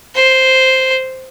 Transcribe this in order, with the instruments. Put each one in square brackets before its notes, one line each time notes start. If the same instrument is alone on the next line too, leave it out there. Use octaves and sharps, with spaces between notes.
[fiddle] C5